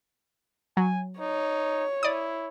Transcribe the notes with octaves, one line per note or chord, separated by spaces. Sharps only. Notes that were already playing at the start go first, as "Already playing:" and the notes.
F#3 G#5
D#4 C#5
E4 D5 D#6